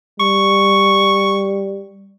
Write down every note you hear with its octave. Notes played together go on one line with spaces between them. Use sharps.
G3 C#6